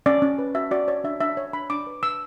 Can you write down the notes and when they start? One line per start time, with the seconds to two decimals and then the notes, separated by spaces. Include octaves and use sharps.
0.06 C#4 D5
0.22 C#4
0.39 B4
0.55 F#4 E5
0.71 F#4 D5
0.88 C#5 D5
1.04 D4 E5
1.20 D4 E5
1.37 C#5
1.53 D4 B5
1.70 D4 D6
1.87 B4
2.03 B4 E6